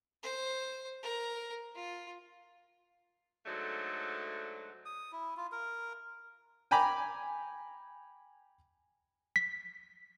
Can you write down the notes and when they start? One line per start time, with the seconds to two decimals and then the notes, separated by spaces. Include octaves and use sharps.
0.23 C5
1.03 A#4
1.75 F4
3.45 G#2 D3 F#3 A3
4.86 D#6
5.12 E4
5.37 F4
5.52 A#4
6.71 G5 G#5 A#5 B5 D6
9.36 B6